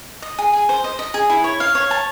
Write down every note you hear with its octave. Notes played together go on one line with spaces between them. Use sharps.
D#5
G#4
G#4
C5
D#5
D#5
G#4
E4
C#5
F5
C#5
A5